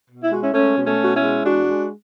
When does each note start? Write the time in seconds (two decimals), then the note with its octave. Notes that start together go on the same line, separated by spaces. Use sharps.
0.09 B2
0.24 E4
0.32 G#3 F#4
0.42 C#4 E4
0.54 G#3 A3 C#4
0.77 B2
0.85 A3 C#4
1.00 B2 F#4
1.16 C#4 E4
1.23 G#3
1.46 E2 D4 F#4
1.69 G#3